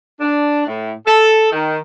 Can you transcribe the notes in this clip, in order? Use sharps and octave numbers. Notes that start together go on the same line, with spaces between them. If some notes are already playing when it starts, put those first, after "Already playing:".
D4
A2
A4
D#3